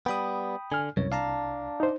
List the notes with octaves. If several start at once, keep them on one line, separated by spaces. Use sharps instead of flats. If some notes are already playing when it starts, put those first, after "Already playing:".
G3 B3 G5 B5 D#6
D3 G#5 F6
C2 F#2 C#5
D4 F5 A5 A#5
D#4 C5